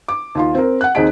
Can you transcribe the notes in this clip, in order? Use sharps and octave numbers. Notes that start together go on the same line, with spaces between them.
D6
D#2 F4 C6
C4 A#4
F#5 F#6
D#2 C4 D#4 G#4 B6 D7